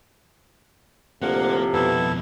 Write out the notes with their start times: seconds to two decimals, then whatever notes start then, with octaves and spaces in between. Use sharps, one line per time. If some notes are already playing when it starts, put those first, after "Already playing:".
1.22 D2 A2 C3 F3 A#3 F#5
1.74 F2 B2 B3 E4 A4